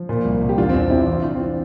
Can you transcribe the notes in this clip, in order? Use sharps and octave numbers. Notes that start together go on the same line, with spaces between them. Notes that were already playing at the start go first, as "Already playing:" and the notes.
Already playing: F3
A#2
C2
C2
G4
E2 D4 F4
C4
E2 D4
E2 C4 E4
E3 D4 F4
E3 D4 F4
C4
E3 D4